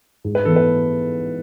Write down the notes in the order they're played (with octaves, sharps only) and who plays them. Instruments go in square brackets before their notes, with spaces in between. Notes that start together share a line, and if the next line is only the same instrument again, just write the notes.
[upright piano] G#2
[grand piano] B4
[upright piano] E3 B3 [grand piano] A4
[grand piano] B4